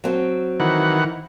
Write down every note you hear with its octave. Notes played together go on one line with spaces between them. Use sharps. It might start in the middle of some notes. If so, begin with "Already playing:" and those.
F#3 C4
D#3 E3 F#5